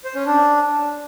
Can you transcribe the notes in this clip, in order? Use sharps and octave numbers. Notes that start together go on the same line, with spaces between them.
C5
C#4
D4